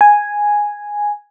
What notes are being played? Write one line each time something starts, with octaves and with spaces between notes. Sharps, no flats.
G#5